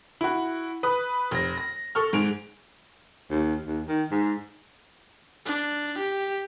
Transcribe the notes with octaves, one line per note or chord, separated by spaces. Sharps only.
E4 F#4
B4 D#6
F1 A#6
A#6
A4 C#6 F6
G#2 G#4 D7 F7
D#2
D#2
D#3
G#2
D4
G4